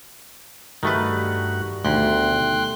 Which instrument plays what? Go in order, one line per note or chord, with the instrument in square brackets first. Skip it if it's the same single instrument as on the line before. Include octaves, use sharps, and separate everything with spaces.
[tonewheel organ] G2 F#4 [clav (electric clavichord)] D#3 A3 B4 [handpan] G3
[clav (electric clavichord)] D2 [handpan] B2 D#3 A3 [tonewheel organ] G5 C6 F#6